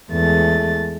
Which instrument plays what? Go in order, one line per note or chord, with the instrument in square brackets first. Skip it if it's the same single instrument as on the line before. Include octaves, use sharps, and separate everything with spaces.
[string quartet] E2 G#3 A3 A6